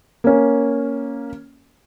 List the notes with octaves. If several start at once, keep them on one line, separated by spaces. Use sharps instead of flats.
A#3 C#4